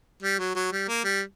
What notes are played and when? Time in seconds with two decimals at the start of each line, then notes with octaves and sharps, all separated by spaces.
0.23 G3
0.39 F#3
0.55 F#3
0.72 G3
0.88 A#3
1.04 G3